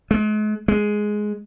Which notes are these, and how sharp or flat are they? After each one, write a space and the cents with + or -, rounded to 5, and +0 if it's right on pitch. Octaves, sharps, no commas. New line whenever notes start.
G#3 +45
G#3 +5